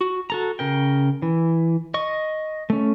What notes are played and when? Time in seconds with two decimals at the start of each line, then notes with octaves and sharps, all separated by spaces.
0.01 F#4
0.30 F#4 A4 A#5
0.59 C#3 A#4 G5
1.22 E3
1.94 D#5 C#6
2.70 A3 C#4